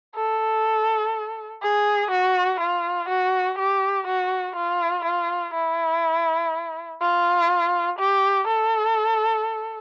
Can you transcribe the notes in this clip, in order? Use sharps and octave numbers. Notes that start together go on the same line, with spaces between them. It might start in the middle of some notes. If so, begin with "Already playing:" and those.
A4
G#4
F#4
F4
F#4
G4
F#4
F4
F4
E4
F4
G4
A4